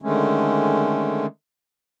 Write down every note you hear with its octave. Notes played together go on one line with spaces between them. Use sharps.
D3 D#3 G#3 A3 C#4